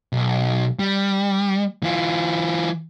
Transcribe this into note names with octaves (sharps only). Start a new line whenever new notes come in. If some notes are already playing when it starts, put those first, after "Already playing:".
B1
G3
E3 F4